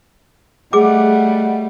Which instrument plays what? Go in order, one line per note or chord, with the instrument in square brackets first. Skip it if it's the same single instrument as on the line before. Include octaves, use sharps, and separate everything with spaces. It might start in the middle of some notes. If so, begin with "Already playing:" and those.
[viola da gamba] G3 A3 [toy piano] G#4 D6 [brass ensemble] D#5 F#5